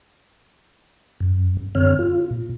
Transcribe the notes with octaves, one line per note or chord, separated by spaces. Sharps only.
F#2
F#2 D3 C4 C#5 F6
F4
A#2